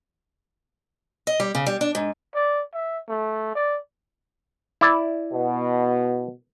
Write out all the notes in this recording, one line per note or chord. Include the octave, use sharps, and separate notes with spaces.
D#5
G3
C#3
G3
D4
G#2
D5
E5
A3
D5
E4 D5
B2